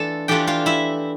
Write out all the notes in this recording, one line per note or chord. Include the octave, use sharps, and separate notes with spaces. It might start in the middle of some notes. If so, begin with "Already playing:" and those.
Already playing: E3 A3 D4 F4 A4 A5
E3 A3 D4 F4 G4 G5
F4 F5
E4 E5